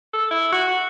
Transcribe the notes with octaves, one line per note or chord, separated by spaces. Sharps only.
A4
E4
F#4